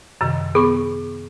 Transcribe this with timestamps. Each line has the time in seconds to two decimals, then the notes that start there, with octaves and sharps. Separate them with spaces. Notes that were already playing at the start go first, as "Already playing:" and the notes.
0.21 F#2 C3 D#3
0.55 B3 G#4 C#6